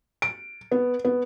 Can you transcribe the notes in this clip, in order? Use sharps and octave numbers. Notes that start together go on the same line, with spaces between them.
D7
B3
B3